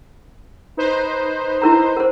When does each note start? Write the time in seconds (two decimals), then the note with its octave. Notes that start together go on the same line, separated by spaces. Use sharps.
0.77 D#4 B4 C5
1.62 E4 A#4 A#5
1.97 A#4 C5